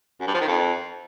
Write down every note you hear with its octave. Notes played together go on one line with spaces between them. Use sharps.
F#2
G2
F3
D#3
F2